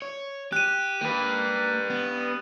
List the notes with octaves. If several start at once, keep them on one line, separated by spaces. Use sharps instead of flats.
C#5
G4 F#6 D#7
A#3 G4 B4
B3